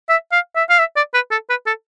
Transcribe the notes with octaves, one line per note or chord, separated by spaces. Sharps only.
E5
F5
E5
F5
E5
D5
B4
A4
B4
A4